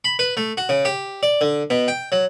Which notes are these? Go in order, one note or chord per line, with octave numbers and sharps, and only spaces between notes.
B5
B4
A3
F#4
C#3
G4
D5
D3
B2
G5
F#3